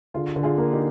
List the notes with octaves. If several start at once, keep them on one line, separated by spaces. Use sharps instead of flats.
D3 F4 G#4
D3
F4 G#4
A#3
D#4 G4